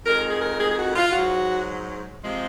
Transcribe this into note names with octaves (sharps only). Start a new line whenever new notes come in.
F2 D#3 G#3 A#4
G#4
A#4
G#4
G#4
F#4
F4
G#2 F#3 F#4
C3 F3 G#3